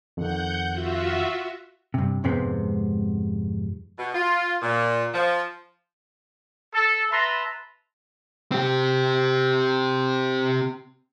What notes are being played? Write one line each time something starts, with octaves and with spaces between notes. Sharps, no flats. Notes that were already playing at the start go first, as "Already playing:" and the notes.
F2 D#3 F#5 G6
F4 F#4 E5
G2 C3
F2 G#2 C3 G#3 B3 C4
B2
F4
A#2
F3
A4
B4 E5 A5 A#5 C6
C4 G4